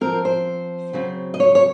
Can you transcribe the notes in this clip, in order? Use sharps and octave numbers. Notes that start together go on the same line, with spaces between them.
F3 C4 A#4
C5
C#3 F#3 C4
D#5
C#5
C#5